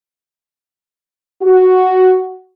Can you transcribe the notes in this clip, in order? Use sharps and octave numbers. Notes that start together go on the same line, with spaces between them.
F#4